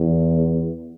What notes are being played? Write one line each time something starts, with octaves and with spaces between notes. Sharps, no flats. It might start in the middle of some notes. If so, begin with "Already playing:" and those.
Already playing: E2